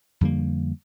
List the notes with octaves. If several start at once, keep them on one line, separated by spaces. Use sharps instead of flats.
F2 D3 G3 A#3